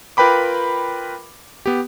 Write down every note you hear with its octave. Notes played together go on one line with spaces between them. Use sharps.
F4 A#4 B4 G5 B5 D6
B3 G4